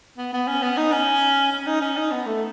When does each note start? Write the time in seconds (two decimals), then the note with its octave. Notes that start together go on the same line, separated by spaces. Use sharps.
0.18 B3
0.33 B3
0.48 C#4
0.63 B3
0.77 D#4
0.92 C#4
1.52 C#4
1.67 D#4
1.81 C#4
1.97 D#4
2.12 B3
2.26 A3